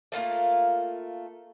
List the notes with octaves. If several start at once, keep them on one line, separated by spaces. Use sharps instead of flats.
A3 A#3 F4 A#4